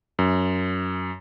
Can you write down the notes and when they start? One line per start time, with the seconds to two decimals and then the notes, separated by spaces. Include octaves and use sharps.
0.19 F#2